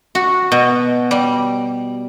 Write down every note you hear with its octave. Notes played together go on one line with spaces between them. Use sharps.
F#4
B2
G3